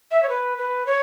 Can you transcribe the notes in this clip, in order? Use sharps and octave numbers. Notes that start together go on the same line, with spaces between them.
E5
C#5
B4
B4
C#5